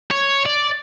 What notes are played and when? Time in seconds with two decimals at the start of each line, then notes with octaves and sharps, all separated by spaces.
0.11 C#5
0.45 D5